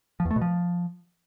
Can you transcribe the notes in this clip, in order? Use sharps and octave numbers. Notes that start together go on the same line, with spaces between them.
F3
E2
A3
B2
F3